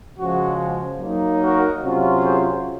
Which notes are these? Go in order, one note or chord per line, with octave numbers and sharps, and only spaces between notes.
C#3 F3 G#3 F#4
F#3 A#3 D#4
F#4 A#4
C3 F#3 C#4 F4
G#4 C5